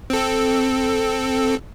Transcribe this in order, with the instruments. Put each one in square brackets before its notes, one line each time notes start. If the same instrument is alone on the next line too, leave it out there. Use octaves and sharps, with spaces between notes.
[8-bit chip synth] C4 A4